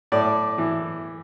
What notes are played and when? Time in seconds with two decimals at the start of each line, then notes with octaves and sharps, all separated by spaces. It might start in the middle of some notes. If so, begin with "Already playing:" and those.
0.12 A2 D5
0.58 E3